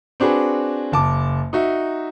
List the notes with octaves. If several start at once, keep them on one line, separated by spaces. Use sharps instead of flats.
C4 D4 F#4 G#4 B4
F#1 A5 D6
D#4 F#4 E5